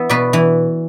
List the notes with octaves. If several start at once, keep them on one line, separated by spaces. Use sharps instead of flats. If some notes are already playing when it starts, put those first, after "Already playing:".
Already playing: E3 B3 E5
B2 B4 D5
E3